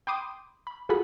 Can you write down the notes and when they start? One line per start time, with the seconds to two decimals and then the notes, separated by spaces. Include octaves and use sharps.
0.07 G5 B5 C6 D6 D#6
0.67 B5
0.89 F4 F#4 G#4 A4 F#5 B5